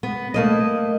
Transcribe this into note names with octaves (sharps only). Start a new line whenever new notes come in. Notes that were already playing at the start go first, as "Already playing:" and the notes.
B3
A3 A#3 D#5